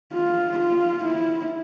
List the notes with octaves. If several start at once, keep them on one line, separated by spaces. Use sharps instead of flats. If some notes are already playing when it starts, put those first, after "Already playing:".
F4
F4
E4